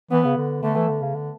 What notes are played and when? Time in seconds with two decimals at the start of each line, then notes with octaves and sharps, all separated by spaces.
0.11 E3 B3
0.25 C#3
0.36 D3
0.63 D3 A3
0.76 E3
0.88 D3
1.02 C#3
1.14 D3